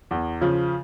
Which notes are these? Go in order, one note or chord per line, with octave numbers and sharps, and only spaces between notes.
E2
C#3 F3